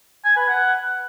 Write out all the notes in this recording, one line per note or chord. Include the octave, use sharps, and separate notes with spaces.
G#5
B4
F#5